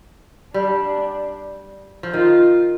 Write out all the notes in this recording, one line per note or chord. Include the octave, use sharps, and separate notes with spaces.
G3 D4
F3
D#3 F4